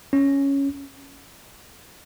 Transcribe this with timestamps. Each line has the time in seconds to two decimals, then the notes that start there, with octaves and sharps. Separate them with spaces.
0.13 C#4